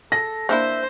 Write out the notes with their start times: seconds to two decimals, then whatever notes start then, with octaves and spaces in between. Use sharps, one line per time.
0.12 A4 A#6
0.49 A#3 D4 E4 C5 E5